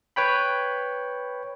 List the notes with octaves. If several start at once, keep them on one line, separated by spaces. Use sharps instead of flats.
B4 C#5 G5 B5